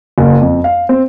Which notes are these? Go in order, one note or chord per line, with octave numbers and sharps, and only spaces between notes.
F#1
F2
F5
C4